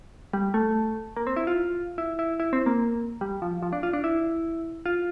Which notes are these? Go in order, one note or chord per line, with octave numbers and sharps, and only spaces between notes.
G3
A3
A#3
C4
E4
F4
E4
E4
E4
C4
A#3
G3
F3
F3
D4
F4
D4
E4
F4